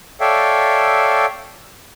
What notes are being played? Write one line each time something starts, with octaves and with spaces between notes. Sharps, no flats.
A4 C#5 D5 E5 F5 G5